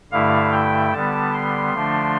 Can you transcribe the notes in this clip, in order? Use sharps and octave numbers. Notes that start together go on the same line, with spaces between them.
G2 D3 A3 E4 F5
G5
D3 G3 B3 A5
C6
D3 F3 A3 D4